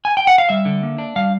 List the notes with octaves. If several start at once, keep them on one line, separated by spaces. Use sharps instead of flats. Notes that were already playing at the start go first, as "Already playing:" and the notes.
G#5
G5
F#5
F5
G3 E5
D3
A#3
D4
G3 F5